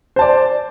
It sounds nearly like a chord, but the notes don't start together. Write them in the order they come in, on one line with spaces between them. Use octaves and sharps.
C5 A5 D5